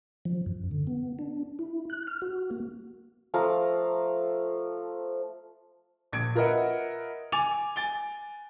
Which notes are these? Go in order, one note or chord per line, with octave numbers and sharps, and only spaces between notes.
F3
F#2
D3
B3
D4
E4
F#6
F6
F#4
A#3
F3 A3 F5 A#5
A#1 G#6 D7
F4 A#4 B4 D#5 E5 F#5
G#5 D6 A6 F7
G#5 A6 D7 G7